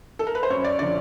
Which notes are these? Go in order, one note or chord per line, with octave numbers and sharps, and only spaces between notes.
A4
A#4
B4
C5
F#2 C#5
D5
D3 F3 D5